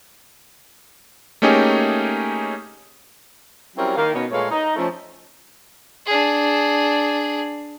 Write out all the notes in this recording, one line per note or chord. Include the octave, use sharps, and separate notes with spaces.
A3 A#3 C#4 D#4 G4 G#4
F#3 G3 C4 C#4 E4 A#4
D#3 A#3 F5
B2 B3 C#4 D#4 A#4 C#5
A#2 G#3 A3 B4 C#5 F5
D#4
F3 A3 C#4
D4 G#4